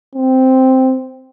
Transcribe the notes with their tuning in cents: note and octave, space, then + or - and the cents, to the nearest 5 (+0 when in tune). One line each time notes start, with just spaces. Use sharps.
C4 -5